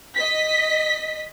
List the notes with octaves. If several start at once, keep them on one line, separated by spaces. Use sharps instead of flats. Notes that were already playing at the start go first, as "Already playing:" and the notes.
D#5 B6